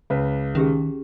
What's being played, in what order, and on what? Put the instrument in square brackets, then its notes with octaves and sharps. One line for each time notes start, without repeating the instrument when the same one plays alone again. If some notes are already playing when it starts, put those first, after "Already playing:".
[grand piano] C#2 B4
[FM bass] D#3 [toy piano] C#4 G4 G#4